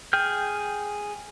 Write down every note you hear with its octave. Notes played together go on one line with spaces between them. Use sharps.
G#4 G5 F6 G6